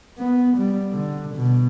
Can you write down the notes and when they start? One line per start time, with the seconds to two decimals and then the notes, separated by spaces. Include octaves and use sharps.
0.18 B3
0.57 G3
0.93 D3
1.35 B2